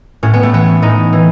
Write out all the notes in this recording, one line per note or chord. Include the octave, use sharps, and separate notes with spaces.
A2 C#4
B3
A3
E3 B3
A2 D#4
E3